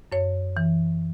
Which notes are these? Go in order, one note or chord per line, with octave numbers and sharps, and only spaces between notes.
F#2 C#5
E3